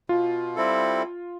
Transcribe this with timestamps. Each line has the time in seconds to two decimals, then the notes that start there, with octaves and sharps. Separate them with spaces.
0.09 B2 F4
0.56 G3 C4 E4 A4